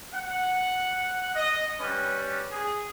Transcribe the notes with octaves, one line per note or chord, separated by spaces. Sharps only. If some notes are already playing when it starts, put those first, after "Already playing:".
F#5
D#5
G3 C#4 B4
G#4